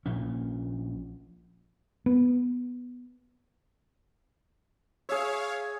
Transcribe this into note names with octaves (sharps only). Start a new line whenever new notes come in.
A#1 A#2 F3 C#4
B3
G#4 C#5 E5 F5